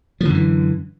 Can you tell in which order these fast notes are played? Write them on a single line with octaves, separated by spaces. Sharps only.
F3 D3 F#2 E3